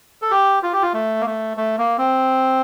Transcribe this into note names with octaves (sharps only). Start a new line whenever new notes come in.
A4
G4
F4
G4
F4
A3
A#3
A3
A3
A#3
C4